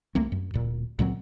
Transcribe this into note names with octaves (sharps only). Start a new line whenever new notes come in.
C2 A3 A#3 C4
F#2
D1 A#2
C#2 A#2 F#3 C4